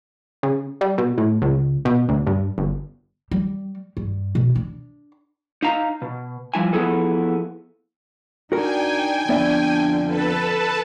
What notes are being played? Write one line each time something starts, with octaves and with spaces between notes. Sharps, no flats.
C#3
G3
B2
A2
C#2
B2
D2
G2
G1
G3
G2
B2
D4
D#4 F5 A#5
B2
F3 G3 E4 G#5
F3 B3 C4 E4 G#4 A4
D4 D#4 F#4 A#4 G5 G#5
F2 D3 B3 D4 D5 E5
A4 B4 A5